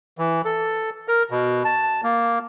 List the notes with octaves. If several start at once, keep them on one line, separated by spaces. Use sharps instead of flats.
E3
A4
A#4
B2
A5
A#3